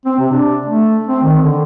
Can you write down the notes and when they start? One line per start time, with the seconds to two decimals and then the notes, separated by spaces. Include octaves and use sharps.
0.05 C4
0.19 C3
0.32 D4
0.66 A3
1.07 C4
1.23 D#3
1.42 D3